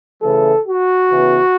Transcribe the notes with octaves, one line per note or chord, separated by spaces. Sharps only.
C#3 E3 A3 A4
F#4
C#3 E3 B3